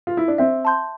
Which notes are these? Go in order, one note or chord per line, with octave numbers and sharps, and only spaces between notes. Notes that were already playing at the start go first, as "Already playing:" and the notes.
F4
E4
D4
C4 E5
A5 C6 G6